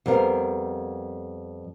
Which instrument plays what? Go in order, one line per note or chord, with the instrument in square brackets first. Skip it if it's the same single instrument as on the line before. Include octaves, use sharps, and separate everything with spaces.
[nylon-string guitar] F2 G3 B3 A#4 F5